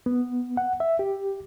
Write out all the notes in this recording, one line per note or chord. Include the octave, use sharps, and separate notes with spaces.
B3
F#5
E5
G4